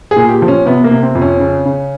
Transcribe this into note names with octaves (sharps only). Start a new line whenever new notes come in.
G#4
A#2
G4
F3
C#4
C3 B3
A#3
C3
C4
F2
C#4
C#3
C#3